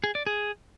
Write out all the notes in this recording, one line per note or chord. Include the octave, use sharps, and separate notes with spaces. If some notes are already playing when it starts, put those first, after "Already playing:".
G#4
D5
G#4